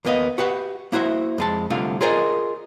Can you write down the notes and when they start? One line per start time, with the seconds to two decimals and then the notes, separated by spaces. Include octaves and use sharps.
0.05 D#2 A#3 B3 D#5 F5
0.38 F#4 G4 B4 E5 F#5
0.92 A#3 E4 F#4 C5 E5
1.38 F2 G#3 A5
1.70 C2 D3 A3 F4 F5
2.01 F4 G#4 A#4 C5 D5 D#5